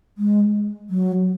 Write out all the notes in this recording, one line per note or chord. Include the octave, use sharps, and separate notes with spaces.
G#3
F#3